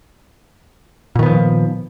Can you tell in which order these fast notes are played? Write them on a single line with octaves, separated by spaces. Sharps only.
A#2 D#3 B3 F3